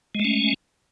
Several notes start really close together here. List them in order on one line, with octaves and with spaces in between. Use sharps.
G#3 A3 C#4